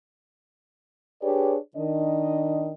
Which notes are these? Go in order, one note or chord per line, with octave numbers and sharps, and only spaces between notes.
D4 G4 G#4 B4 C#5 D5
D#3 D4 D#5